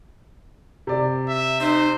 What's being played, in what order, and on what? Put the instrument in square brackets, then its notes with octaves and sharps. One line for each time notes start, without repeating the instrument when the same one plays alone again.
[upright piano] C3 D5
[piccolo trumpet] E5
[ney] D#4 [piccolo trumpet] C5